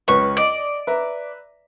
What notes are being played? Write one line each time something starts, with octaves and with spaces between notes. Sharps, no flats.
C#2 C#4 B4 C#6
D5 D#5
B4 E5 A#5